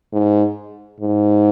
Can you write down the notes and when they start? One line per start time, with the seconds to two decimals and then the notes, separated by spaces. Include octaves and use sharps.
0.13 G#2
1.00 G#2